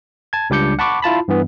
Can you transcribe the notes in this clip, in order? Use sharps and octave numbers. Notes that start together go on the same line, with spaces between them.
A5 G#6
C#2 G3 D4 D6 G6 C#7
F#5 A5 B5 C#6 D6
E4 F4 A5 B5
G2 E3 B3